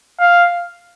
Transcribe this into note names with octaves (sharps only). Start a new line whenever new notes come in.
F5